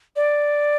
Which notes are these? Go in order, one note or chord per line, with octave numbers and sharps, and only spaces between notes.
D5